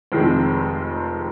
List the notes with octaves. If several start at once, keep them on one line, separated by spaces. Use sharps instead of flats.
F1 F2 D#3 G#3 C4